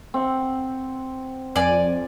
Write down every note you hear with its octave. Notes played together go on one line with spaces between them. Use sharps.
C4 F#5
F2 D5 G#5